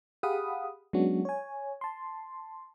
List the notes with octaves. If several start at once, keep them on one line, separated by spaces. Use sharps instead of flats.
G4 G#4 F5 F#5 B5 D#6
F#3 G#3 B3 C#4 D4 F#4
C#5 G#5
A5 C6